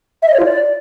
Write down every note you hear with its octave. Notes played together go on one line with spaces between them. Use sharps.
E5
D#5
C#5
F4
D5